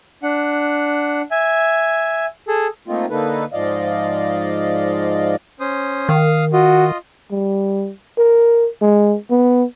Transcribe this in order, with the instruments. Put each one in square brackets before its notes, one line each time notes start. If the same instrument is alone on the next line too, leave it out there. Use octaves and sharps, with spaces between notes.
[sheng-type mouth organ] D4 F#5
E5 G#5
G#4 A4
[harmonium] A3 A#3 C4 D#4 F4
D3 A#3 D#4 A4 B4
G#2 F3 D5 D#5 F5
[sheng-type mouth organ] C#4 C5 D#6
[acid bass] D#3 [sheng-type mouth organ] F5 D#6
[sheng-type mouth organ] F4 D#5 [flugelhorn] F#4
[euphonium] G3
A#4
G#3
B3